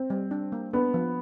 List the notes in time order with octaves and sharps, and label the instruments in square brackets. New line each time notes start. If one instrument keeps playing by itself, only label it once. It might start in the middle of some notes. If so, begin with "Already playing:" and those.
Already playing: [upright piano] C4
[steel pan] G3
D4
A#3
[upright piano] B3 [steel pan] D4
[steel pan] F3